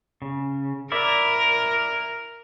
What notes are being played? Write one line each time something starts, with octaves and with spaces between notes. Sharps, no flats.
C#3
E4 A#4 D5 E5